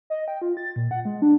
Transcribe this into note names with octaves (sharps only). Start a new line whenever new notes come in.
D#5
G5
F4
A6
A#2
F#5
G#3
D4